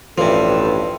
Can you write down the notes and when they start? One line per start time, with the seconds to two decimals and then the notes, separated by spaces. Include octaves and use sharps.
0.18 A1 G2 C3 F3 A4